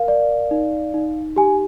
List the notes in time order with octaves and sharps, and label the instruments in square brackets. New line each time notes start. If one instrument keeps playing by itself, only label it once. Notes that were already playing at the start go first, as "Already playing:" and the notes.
Already playing: [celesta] A#4 F5
D5
D#4
D#4
G4 G#5